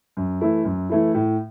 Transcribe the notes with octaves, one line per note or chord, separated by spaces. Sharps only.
F#2
E3 A3 E4
F#2
E3 A3 E4
A2